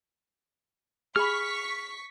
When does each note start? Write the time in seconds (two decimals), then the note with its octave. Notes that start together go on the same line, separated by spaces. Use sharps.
1.16 G#4 B5 C#6 F6 B6